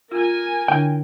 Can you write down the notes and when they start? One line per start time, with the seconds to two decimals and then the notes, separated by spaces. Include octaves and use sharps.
0.12 F4 A#4 G#5
0.68 D3 D4 E4 G5